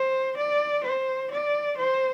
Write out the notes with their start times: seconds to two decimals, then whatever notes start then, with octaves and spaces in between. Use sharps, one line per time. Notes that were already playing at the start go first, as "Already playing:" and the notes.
Already playing: C5
0.37 D5
0.84 C5
1.31 D5
1.78 C5